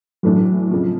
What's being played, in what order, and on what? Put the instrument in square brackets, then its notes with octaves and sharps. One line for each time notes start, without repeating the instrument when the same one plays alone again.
[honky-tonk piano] A2 E3 A3 D4 [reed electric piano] F#3
[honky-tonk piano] F2 C#3 F3